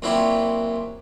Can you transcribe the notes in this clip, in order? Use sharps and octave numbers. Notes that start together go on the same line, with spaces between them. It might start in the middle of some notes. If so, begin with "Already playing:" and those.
A#2 F#3 C4 E4 G4